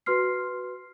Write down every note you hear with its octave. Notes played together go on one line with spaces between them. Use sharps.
F#4 B4 C6 F6 C7